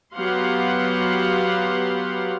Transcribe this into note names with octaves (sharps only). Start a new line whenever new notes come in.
F#3 B3 G4 F5 F#5 C6